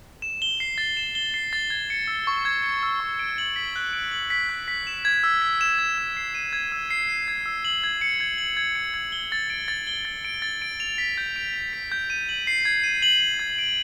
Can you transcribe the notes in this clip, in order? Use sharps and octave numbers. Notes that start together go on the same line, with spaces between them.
E7
G7
C7
A6
E7
G7
C7
A6
G#6
C#7
E6
C#6
G#6
C#7
E6
C#6
D7
F#7
B6
F#6
D7
F#7
B6
F#6
B6
E7
G#6
E6
B6
E7
G#6
E6
C7
D#7
G#6
E6
C7
D#7
G#6
E6
F#7
G#6
C#7
G#6
F#7
G#6
C#7
G#6
G7
A6
D7
A6
G7
A6
D7
A6
D7
F7
B6
G6
D7
F7
B6
G6
D#7
F#7
C7
G#6
D#7
F#7
C7
G#6
D7